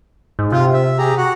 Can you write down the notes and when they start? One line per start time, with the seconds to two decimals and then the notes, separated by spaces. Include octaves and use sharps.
0.39 G#2
0.52 C3 F4
0.73 E5
0.98 G4 G#4 A#5
1.18 F#4 F#5